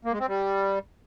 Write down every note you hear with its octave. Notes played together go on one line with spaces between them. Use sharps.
A#3
G#3
C4
G3